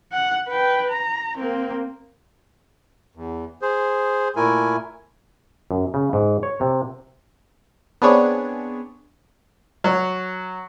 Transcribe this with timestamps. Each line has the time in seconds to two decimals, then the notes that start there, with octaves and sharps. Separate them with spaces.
0.13 F#5
0.48 B4 G5
0.89 A#5
1.37 A#3 C4
3.15 E2
3.62 G#4 C5
4.36 A#2 A3 E4 A#4 G#5
5.71 F#2
5.94 C#3
6.13 G#2
6.43 C#5
6.61 C3
8.02 B3 C4 D4 G#4 C#5
9.84 F#3